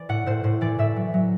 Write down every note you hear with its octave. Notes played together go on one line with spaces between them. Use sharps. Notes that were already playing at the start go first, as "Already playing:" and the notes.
Already playing: E3 C5 D5
A2 F#5
A2 C5
A2 C5
E3 D5
A2 E5
F#3
F#3